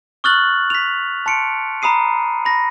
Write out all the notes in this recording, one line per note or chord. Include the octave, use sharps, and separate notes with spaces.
C#6 D#6 F6 F#6 A6 F#7
B6 F7
A5 C6 C#7 D7
A#5 B5 D#6 C7 D#7
B5 A#6